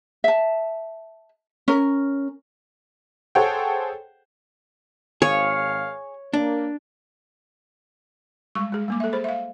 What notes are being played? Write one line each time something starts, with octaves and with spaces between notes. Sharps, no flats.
E5 A5
C#4 A#4
G#4 A4 C5 C#5 F#5 G5
G#1 G#4 C#5 F5
A#3 D4
G3 G#3 C#6
G#3 G#4
G3 A#3 D6
A4 E5
G#4 C5 B5
E5 F5